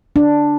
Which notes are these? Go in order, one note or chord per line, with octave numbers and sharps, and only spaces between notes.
D4